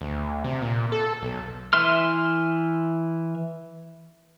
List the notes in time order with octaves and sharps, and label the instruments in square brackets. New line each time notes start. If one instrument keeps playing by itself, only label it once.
[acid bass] D2
C3
A#2
A4
B1
[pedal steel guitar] E3 E5 C6 F6